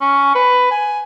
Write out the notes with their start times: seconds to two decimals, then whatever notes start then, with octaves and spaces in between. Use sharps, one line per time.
0.01 C#4
0.35 B4
0.71 G#5